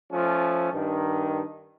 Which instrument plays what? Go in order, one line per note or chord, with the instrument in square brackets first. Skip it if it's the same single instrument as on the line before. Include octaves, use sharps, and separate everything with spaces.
[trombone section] F3 A3 C#4
G2 D#3